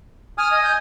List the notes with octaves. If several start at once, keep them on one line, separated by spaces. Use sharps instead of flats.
G#5 D#6 F6
D#5
G6